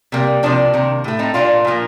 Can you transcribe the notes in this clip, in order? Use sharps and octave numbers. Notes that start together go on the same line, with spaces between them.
C3 G3 A#3
C3 F3 A#3 D4
C3 D#3 A#3
A2 A3
C4 D#4
A#2 G3 A#3 D4 F4
A#2 F3 A#3